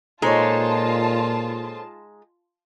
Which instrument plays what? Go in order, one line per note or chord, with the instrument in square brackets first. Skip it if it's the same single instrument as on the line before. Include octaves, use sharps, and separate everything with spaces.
[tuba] A#2 [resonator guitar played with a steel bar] G#3 D#4 [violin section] F4 A5 [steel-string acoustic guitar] A4 C5 C#5